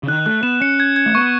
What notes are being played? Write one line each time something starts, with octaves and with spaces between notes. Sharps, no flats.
C#3
D#3 F#6
A3 F#6
B3 E7
C#4 C#7
G#6
G#6
A3
B3 C#6